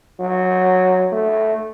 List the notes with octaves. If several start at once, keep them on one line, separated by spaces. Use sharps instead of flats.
F#3
A3